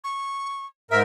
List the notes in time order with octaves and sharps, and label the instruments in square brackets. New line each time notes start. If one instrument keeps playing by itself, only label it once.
[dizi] C#6
[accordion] G#2 A#4 [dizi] E5